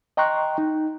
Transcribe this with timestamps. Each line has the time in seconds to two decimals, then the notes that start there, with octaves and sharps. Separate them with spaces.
0.17 D#5 G5 A#5 C6 C#6 F#6
0.58 D#4